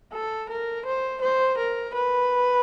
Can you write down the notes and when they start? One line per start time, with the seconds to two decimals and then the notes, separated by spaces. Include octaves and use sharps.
0.13 A4
0.50 A#4
0.86 C5
1.22 C5
1.58 A#4
1.94 B4